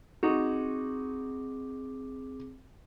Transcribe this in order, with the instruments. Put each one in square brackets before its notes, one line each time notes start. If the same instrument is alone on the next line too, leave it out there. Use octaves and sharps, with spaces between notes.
[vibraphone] C4 G#4 D6 [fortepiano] D#4 F#4